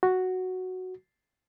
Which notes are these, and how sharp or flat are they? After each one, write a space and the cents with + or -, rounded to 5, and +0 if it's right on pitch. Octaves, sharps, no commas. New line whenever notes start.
F#4 +0